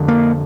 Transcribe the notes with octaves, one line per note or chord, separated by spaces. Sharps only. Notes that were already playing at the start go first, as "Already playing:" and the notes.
Already playing: F2 D3
A#3